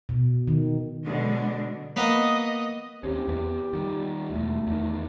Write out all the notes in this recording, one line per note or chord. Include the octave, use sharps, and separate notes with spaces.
B2
D#3
B2 D3 F#3 G#3 D4
A#3 B3 B4 D#5
D#2 C4 C#4 G4
E2 B3
D#3 G3
E1 E2 A3
E2 D#3